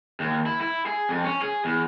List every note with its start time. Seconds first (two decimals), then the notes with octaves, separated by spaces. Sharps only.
0.20 D#2
0.46 E4
0.61 E4
0.86 G#4
1.09 F2
1.24 C#4
1.42 G#4
1.65 E2